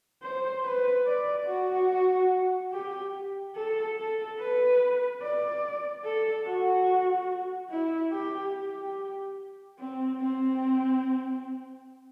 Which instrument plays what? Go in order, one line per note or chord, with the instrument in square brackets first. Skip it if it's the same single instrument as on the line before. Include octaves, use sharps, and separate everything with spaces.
[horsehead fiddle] C5
B4
D5
F#4
G4
A4
A4
B4
D5
A4
F#4
E4
G4
G4
C4
C4